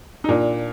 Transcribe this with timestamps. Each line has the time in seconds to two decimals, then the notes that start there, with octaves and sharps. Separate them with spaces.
0.24 D#4
0.29 A#2 D4